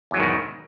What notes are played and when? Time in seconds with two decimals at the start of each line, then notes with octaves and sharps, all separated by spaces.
0.11 E2
0.14 F#3
0.17 G#2
0.20 D#3
0.23 B2